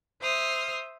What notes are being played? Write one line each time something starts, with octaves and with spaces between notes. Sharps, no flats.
C5 E5 D#6 F6